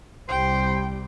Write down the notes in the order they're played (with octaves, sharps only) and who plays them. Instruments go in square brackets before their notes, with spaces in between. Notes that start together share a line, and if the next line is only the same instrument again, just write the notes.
[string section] C2 C3 G3 [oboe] C5 [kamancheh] G5